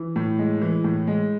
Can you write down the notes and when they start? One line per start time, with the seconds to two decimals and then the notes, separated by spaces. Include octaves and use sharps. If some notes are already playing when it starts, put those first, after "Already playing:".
Already playing: E3
0.16 A2
0.39 G#3
0.62 E3
0.84 A2
1.07 G#3